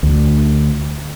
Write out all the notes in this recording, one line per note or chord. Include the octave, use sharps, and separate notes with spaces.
D2